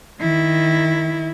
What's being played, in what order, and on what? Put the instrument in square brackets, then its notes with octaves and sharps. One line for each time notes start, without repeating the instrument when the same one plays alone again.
[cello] D#3 E4